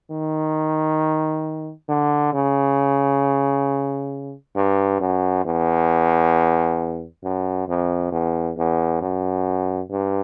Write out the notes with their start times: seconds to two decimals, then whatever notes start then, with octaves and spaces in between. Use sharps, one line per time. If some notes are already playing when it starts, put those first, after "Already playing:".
0.11 D#3
1.88 D3
2.33 C#3
4.56 G2
5.00 F#2
5.45 E2
7.23 F#2
7.68 F2
8.12 E2
8.57 E2
9.01 F#2
9.91 G2